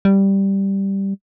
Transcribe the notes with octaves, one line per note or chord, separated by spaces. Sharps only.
G3